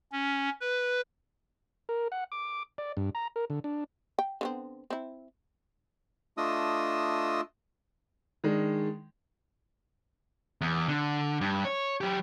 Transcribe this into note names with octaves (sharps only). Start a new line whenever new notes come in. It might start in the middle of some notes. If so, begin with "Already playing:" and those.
C#4
B4
A#4
F#5
D6
D5
G2
A#5
A#4
D3
D4
G5
D3 B3 C4
C4 E4
A3 D4 F4 D#5 D#6 E6
D#3 G#3 D4
E2
D3
G2
C#5
F#3 G4